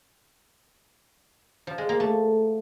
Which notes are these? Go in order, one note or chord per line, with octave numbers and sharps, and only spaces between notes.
F3
G#3
A#3
A3